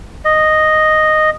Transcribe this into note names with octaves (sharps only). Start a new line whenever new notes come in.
D#5